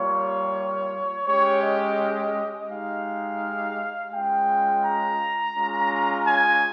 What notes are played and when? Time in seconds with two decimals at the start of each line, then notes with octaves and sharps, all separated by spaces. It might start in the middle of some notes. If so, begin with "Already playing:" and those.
Already playing: G3 A#3 F4 C#5
1.26 G#3 C#4 G4 C#5
1.63 D#5
2.70 G#3 D#4 G4 F5
4.13 G#3 C#4 F4 G5
4.85 A#5
5.56 G#3 C#4 F4
6.27 G#5